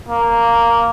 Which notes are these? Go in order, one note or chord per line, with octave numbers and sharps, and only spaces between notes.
A#3